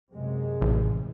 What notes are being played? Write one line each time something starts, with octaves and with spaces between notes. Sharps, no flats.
F#2 C3 G#3
A1